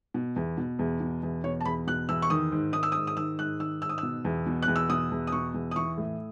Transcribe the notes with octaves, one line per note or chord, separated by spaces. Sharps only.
B2
E2
B2
E2
B2
E2
B2 C#5
A5
E2 B5
B2 F#6
E2 E6
C#6
D#3 D#6
G#2
D#3 D#6
E6
D#6
G#2
D#6
D#3 E6
G#2 F#6
D#3 E6
G#2 E6
D#6
E6
B2
E2
B2
F#6
E2
E6
B2 D#6
E2
D#6
B2 C#6
E2
D#6
E3 C#6
A2